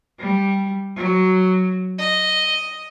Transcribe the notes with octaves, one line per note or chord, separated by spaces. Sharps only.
G3
F#3
D#5